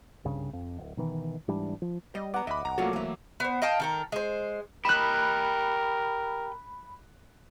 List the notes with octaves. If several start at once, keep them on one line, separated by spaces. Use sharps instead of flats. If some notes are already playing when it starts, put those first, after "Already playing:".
C2 G2 C#3
F2
D1
B2 D#3 E3
G#2 E3 G3 D4
F3
G3 D#5
B3 F#5 A#5 D6
D2 D#5 E5 B5
C2 A#5
F#3 A3 A#3 F4 F#4 A4
E3 E5
B3 C5
D#5 F5 G5 A5
D#3 A4 A#4
G#3 C5
G4 A#4 D#5 B5 F#6 E7